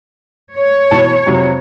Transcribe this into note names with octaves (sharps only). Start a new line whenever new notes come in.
C#5
B2 E3 A5
F2 C3 F#3